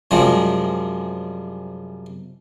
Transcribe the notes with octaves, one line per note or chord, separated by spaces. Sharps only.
F#2 C3 F3 G3 G#3